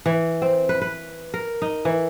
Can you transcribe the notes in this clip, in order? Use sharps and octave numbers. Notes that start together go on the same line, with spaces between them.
E3
C4
B4
B4
A#4
D#4
E3